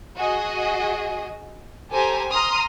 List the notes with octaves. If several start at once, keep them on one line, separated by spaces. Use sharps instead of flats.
F#4 G#4 D#5
G4 A4 C5 G#5 A#5
A#5 C6 D#6 F6